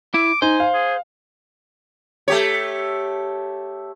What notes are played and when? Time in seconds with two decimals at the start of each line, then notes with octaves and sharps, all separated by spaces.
0.14 E4 D6
0.42 D#4 C5 G#5
0.60 F5
0.74 G#4
2.28 A3 G4 C#5